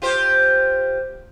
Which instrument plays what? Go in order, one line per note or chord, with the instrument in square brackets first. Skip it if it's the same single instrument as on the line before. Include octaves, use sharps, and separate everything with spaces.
[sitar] F4 G4 C5